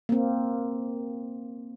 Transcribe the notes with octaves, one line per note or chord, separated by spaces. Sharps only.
A#3 C4